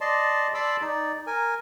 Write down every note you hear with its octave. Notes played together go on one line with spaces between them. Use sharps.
D5 D#5 A5 C6
D5 A5 B5 C6 D6 E6
D#4 D5
A#4 G#5